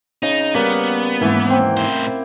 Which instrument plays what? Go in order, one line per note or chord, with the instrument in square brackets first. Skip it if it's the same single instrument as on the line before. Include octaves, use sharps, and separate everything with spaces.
[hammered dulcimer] C#3 [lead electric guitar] D#4
[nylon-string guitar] G3 [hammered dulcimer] A#3 [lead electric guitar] B3
[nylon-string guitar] D#2 G#2 E3 [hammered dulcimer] E4 F#5
[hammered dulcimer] C4
[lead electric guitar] A2 C5